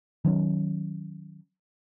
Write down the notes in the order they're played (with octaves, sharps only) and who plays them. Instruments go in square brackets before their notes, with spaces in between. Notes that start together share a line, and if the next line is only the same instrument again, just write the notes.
[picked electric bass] D#3 F#3 C#4